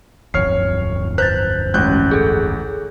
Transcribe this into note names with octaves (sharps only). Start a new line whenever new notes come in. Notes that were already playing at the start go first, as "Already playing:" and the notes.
D1 G1 F2 C#5 F6 C7
B4 C5 F#6 G6 A6
A1 G#3 C#4 F#6 G6
G#4 A4